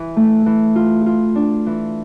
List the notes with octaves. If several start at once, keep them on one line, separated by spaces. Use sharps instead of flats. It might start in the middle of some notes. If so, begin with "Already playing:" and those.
Already playing: E3
A3
E3
F4
F4
D4
E3